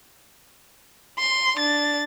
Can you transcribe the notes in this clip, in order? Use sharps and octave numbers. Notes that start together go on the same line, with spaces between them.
C6
D4 A6